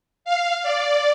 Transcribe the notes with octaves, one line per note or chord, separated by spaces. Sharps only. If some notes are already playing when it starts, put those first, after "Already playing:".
F5
D5